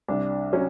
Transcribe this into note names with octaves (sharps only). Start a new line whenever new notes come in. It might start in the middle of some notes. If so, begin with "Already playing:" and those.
C2 D4
F#3 C#4